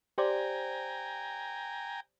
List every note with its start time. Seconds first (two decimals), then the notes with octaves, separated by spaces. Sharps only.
0.18 G4 C5 D5 G5 G#5 A#5